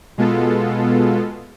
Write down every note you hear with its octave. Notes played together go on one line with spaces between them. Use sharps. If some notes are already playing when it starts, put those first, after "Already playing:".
B2 G#3 B3 F4 A4